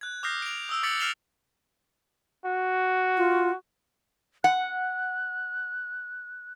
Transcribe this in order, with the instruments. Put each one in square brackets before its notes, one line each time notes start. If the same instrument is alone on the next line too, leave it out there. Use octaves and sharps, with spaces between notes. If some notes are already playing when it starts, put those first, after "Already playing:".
[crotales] F#6 G#6
D6 D#6 F6 G6 A#6 C7
D7 F7
D#6 E6 D7
D6 A6 B6 C#7 F#7
F6 C7 D7 E7 F7 G7
[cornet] F#4
[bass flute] F4
[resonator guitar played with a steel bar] F#5 [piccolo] F#6